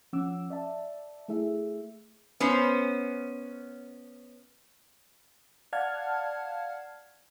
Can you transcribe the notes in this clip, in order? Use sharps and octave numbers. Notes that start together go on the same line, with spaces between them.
F3 C#4 F#5 D6 E6
D5 E5 A5
A3 E4 G#4 E5
B3 C#4 C5
D5 F5 F#5 A5 F6 G#6